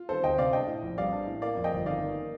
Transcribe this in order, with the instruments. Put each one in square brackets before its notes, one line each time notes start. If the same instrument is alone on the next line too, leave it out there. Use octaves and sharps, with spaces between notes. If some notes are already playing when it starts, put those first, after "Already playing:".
Already playing: [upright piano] F4
[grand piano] D#3 [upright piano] A4 C5
[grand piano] D2 [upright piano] D#5 G5
[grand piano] C3 [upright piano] D5 F5
[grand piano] D4 [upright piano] D#5 G5
[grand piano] A2
A#1
[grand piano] G3 [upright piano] D5 F5
[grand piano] D4
A2
[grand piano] A#3 [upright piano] D5 F5
[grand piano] F2
[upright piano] D#5 G5
[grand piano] G1
[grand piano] D#3 [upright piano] D5 F5
[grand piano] A#3